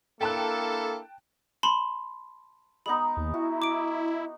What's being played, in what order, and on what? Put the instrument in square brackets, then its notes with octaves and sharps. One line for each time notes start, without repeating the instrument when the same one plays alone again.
[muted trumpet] A#3 [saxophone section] D4 E4 A4 [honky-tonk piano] G5 A5 F#6
[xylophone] A5 B5 C6
[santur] G#3 B3 D#4 [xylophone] B5
[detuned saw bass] D#2
[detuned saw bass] E4 [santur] F#4
[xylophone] D6 D7